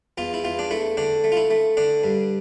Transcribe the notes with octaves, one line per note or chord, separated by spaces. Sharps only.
E2 F4
E4
E2 F4
D4
A3 E4
D3 D4
A3
F4
E4
A3
D3 D4
G2